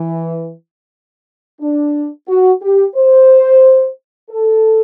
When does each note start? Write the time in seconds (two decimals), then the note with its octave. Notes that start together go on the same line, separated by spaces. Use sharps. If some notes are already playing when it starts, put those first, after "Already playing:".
Already playing: E3
1.61 D4
2.28 F#4
2.62 G4
2.95 C5
4.31 A4